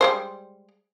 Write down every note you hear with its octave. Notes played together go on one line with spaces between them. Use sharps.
G3 G#3 C5